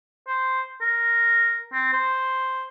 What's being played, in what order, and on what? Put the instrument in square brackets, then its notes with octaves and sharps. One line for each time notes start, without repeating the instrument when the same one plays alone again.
[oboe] C5
A#4
C4
C5